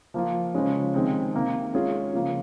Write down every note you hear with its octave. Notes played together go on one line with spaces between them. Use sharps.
F3 A#3 F4
C#3 F3 G#3 C#4
C3 D#3 G#3 C4
C3 D#3 A#3
G#3 C#4 F4 G#4
C#3 F3 A#3 F4